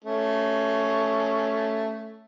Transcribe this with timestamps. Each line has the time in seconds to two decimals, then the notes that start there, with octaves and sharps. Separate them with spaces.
0.04 A3 C#4